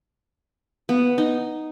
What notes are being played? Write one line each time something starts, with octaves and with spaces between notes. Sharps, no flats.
B3
D#4